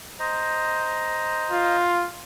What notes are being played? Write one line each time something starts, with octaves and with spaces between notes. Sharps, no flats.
C5 D#5 A#5
F4